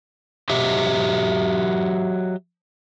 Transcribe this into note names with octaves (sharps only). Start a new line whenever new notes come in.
F#3 G4 D#5 E5